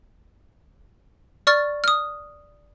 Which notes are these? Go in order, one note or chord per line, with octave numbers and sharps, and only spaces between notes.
D5 C#6 F6 A6
D#6 F6